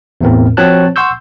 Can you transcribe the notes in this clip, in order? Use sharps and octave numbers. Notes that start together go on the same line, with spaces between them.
E2 A2 C4 A#4
F3 C4 F#4 C#5 A5 F#6
F#5 C6 C#6 E6 G6